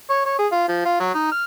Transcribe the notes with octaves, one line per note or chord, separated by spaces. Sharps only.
C#5
C#5
G#4
F4
F3
F4
F#3
D#4
F6